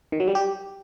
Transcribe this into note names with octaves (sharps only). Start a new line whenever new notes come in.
D#3
F#3
G3
G4